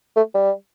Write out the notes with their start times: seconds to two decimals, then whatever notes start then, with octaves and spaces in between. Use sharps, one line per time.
0.16 A3
0.34 G3